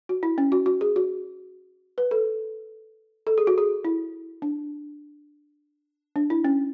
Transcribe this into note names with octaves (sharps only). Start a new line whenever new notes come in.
F#4
E4
C#4
F#4
F#4
G#4
F#4
B4
A4
A4
G#4
F#4
G#4
E4
D4
D4
E4
C#4